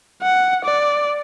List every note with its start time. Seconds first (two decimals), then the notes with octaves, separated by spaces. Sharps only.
0.22 F#5
0.64 D5